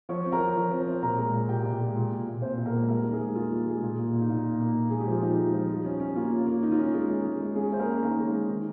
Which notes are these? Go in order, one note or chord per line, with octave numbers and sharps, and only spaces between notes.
F3 C#5 C#6
C4
A#4 A#5
F3
F3
C4
C4
A#2 A#4 A#5
G#3
A#2
A#2 G4 G5
A#2
G#3
A#2
A#2
A#2
A#2 C4 C5
A#2
A#3 A#4
G#3
G3 A#3 A#4
D#3
G#3 G#4
A#3
A#3 F4
G3
G3 G#3 G#4
A#2
A#3
A#2
D#4
A#2 F4
A#3
A#3
A#2
G#3 G#4
G4
F3 F4
F3 D#4
G#3
F3
G3
C#4
C#4
A#3 F4
C#4
A#3
D#3 D#4
F4
C#4 D#4
G#3
C#4
G#3
G#3
G#3 C#4 G#4
C#4 C5
A#3 A#4
C#4
D#3 A#3 A#4
G#3
G#3
D#3